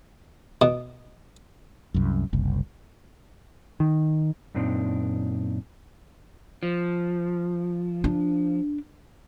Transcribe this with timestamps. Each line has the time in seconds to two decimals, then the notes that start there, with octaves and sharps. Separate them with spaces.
0.61 B2
1.94 C2 F#2
2.33 F#1 C2
3.80 D#3
4.54 F#2 A#2 C4 D4 D#4
6.63 F3
8.04 D4